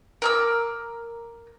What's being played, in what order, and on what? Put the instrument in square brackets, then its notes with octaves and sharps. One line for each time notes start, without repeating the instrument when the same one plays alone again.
[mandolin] A#4 D6 E6